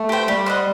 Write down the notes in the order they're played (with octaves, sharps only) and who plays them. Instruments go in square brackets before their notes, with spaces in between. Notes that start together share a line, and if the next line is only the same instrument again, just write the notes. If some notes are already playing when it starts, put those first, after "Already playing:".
Already playing: [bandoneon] A3
[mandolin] G4 C5 G5
[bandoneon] G3 [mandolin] G4
[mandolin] C5 D#5 F#5